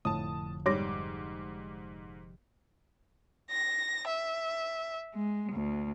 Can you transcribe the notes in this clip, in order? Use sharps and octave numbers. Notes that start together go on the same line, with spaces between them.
F1 F2 A2 D3 A5 D#6
G#2 G3 C#5 C6 D6 A#6
A#6
E5
G#3
D2